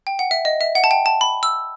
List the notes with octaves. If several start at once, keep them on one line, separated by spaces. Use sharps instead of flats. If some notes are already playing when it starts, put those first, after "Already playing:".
G5
F#5
E5
D#5
E5
F#5
A5
G5
A5
B5
E6